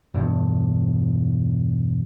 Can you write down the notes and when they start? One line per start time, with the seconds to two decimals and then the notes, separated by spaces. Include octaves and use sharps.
0.14 E1 G2